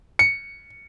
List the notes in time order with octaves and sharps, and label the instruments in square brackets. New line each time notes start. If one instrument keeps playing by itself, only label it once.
[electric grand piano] C#7